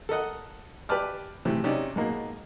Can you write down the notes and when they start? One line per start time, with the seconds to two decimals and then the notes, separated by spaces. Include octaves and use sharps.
0.09 A4 A#4 D#5 F#5
0.89 G4 B4 D5 A5 D6 F6
1.45 A2 C3 E3
1.64 C3 C#4 D#4 D5
1.96 G#2 B2 A#3